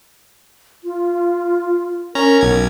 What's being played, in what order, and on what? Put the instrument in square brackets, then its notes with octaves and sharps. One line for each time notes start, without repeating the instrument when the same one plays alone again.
[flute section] F4
[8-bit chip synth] C#4 A#5 [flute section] A#4
[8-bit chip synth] B1 G#6